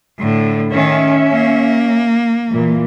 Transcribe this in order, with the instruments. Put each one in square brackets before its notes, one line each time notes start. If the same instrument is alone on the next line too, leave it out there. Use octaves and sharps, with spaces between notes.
[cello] A2 D3
[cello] D#3 [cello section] C#4 E5
[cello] A#3
[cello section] A#2 E3